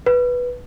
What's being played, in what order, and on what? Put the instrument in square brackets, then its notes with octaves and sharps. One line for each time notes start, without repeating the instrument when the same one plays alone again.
[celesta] B4